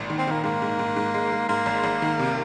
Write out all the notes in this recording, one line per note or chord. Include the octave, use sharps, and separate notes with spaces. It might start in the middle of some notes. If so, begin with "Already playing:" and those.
Already playing: G#1 A#2
D#3
C4
D#3 A#3
G#2 A#3
G#2
G#2
G#2
G#3
G#3
G#2 A#3
G#1
G#1
D#3
C3